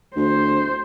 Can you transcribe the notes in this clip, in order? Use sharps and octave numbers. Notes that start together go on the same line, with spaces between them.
D2 C5